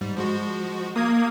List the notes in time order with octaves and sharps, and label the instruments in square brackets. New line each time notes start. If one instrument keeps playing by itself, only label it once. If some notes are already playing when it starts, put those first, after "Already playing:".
[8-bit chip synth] G#2 G3
F3 G#3 F#4
[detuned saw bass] A#3 [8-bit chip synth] D#6 G#6